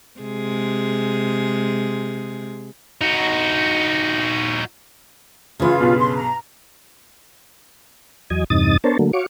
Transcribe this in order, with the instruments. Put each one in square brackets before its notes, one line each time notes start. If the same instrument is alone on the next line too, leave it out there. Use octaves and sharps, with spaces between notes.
[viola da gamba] C3 G#3 G#4
[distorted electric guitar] D#4 F#4
[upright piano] F#2 E3 [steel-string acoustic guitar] C#3 B4 [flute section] F4
[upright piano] B1 G2 B2
[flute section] C6
A#5
[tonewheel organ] E2 F#3 D#5 G#5
E2 G2 C3 D#4 D#6 A6
B3 D4 A#4 C5 C#5 A5
D3 F#3 A3 A#3
F#4 C#5 F5 C#6 D6